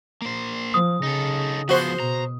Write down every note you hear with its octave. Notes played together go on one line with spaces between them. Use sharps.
A#3 C5
F3 D#6
C#3 D#4 A4
F3 B3 F#4 C5
B2 A#5